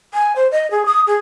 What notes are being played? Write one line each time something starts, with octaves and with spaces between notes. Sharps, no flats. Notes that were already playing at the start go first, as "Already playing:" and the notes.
G#5
C5
D#5
G#4
D#6
G#4